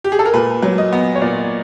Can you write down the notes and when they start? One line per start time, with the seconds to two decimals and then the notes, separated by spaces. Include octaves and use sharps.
0.04 G4
0.12 G#4
0.19 A4
0.25 A#4
0.34 A#2 B4
0.62 F#3
0.78 D#5
0.92 B3
1.15 C#5
1.21 A#2 D5